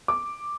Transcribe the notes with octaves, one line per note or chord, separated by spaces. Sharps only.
D6